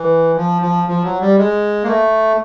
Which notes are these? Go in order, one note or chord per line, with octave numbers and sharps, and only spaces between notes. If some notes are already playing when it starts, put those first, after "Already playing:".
Already playing: E3
F3
F3
F3
F#3
G3
G#3
A#3
A3